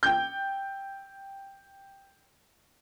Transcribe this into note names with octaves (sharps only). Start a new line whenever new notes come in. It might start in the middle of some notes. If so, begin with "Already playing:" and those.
G5 G6